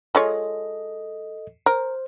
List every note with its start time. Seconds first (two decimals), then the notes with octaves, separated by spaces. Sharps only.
0.15 G#3 F4 A4 C#5 D#5
1.66 A#4 C5